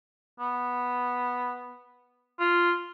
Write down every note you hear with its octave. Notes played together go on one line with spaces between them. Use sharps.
B3
F4